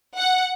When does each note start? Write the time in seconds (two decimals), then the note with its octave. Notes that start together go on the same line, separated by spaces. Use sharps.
0.17 F#5